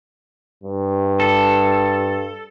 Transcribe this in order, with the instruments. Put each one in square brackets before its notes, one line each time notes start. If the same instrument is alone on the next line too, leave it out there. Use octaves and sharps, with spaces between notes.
[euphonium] G2
[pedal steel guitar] A4